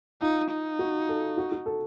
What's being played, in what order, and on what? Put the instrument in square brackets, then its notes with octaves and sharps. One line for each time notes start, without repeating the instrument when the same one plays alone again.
[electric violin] D#4 [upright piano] F4
[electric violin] D#4
[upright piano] F#4
A4
F#4
F#4
A4